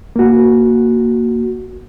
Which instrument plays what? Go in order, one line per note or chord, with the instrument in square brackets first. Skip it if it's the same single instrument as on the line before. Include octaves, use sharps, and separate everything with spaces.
[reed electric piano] A#3 F#4